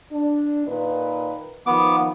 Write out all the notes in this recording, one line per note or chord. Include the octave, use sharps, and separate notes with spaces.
D4
A#2 D#3 B4
D#3 F3 B3 D6